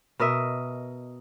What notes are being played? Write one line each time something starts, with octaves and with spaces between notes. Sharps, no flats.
B2 A#4 D#5 E5